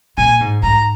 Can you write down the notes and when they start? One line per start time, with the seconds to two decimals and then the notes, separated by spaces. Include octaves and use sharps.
0.18 A#2 G#5
0.40 G#2
0.63 G#2 A#5